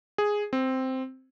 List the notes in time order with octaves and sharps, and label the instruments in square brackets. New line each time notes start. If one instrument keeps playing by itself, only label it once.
[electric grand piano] G#4
C4